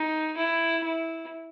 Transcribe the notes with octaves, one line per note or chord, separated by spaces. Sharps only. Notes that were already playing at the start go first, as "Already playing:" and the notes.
Already playing: D#4
E4
E4